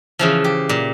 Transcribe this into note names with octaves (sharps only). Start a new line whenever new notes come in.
C#3 E3 F3
G4
A#2